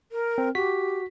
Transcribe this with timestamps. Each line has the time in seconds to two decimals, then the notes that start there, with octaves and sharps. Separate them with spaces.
0.12 A#4
0.38 C4
0.55 F#4 G4 B6